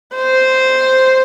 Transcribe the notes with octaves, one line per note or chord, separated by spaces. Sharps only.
C5